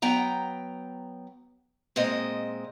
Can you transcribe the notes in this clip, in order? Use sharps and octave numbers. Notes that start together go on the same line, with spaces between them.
F#3 B3 G5 A#5
A#2 G#3 C4 D#5